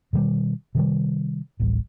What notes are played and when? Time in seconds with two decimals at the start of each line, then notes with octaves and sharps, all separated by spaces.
0.13 B2 D#3 F3 G3
0.75 C3 D#3 G3
1.60 D1 A1 G3